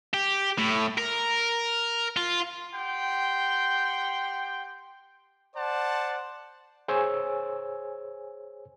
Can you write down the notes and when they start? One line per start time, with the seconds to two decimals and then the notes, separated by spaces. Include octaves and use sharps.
0.14 G4
0.58 A2
0.98 A#4
2.17 F4
2.74 G4 F#5 G5 C6
5.57 C5 D5 F#5 A5
6.88 G#4 C5 C#5 G#5 E6